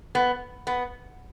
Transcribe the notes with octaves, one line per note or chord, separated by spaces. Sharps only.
B3
B3